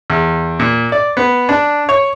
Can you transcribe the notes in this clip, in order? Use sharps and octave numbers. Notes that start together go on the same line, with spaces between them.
E2
A#2
D5
B3
D4
C#5